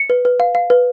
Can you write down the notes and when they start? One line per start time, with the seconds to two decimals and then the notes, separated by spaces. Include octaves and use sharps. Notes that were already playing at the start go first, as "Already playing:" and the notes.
Already playing: C#7
0.10 B4
0.25 B4
0.40 F5
0.55 F5
0.70 B4